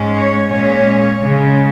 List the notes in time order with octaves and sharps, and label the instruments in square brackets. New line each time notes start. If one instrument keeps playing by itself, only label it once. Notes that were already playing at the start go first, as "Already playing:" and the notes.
Already playing: [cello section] G#2 G#3 C#4
C#5
A#2 G#3 C#4 C#5
C#3 G#3 C#4